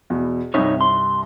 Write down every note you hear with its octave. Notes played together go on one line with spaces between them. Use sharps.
E2 B2
C2 G2 C3 D#4 C#5
C6